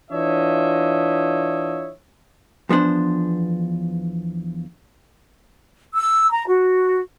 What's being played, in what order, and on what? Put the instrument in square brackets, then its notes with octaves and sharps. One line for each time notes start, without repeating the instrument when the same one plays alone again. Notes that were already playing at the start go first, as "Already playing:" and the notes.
[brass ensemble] E3 D4 F4 C#5 D#5 E5
[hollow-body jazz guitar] E2 F3 B3 D4 C5
[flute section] E6
A#5
F#4